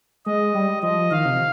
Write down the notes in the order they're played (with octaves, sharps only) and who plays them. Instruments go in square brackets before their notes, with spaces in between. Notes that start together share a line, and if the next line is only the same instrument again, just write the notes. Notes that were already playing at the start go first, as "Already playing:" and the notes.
[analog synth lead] G#3 [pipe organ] D#5
[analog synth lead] G3
[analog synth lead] F3 [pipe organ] D#5
[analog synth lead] D#3 [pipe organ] F5
[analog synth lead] C3